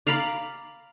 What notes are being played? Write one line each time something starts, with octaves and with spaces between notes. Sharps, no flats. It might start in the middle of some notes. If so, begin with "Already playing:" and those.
D5 F5 A#5 B5